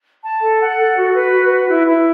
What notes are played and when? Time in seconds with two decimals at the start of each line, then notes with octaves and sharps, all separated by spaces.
0.23 A5
0.41 A4
0.60 F#5
0.78 A4
0.96 F#4
1.14 B4
1.32 F#4
1.50 B4
1.69 E4
1.87 E4